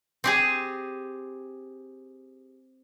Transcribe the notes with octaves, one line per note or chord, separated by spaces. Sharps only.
C4 G4 G#4